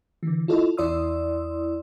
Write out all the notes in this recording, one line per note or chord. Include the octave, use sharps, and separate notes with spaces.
D3 E3
E4 F4 A4 D#5
E2 E4 D5 C6 D#6 E6